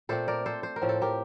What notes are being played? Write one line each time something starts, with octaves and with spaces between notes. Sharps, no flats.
A#2 A3 C4 A4 C5
A#4 D5
A4 C5
C5
A#4
A2 F3 C4
A4
G4 A#4